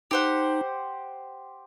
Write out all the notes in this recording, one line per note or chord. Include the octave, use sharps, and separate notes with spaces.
D#4 G4 C5 F#5